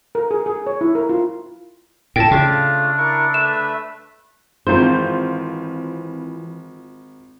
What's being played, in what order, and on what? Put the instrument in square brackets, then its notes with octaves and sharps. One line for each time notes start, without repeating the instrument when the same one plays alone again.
[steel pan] A#4
G#4
G#4
C#5
E4
A#4
F4
[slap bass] A2 [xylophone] G5 A5
[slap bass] C#3 [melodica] A3 F4 F5 [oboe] D4
[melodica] E4 A#4 C#6
[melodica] A3 B4 E5 [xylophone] E7
[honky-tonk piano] G#1 F4 G6 [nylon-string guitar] E3 C4 C5